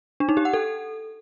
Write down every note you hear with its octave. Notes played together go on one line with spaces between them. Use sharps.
D4
D#4
G4
F#5
A4